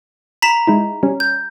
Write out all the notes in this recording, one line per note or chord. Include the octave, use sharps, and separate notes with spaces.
A#5 B5 B6 E7
G#3 D#4 E4
G3 C#4
G6